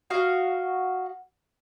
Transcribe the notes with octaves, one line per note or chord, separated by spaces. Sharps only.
F#4 D#5 F5